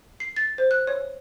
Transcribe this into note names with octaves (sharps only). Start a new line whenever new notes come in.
C7
A6
C5
F#6
C#5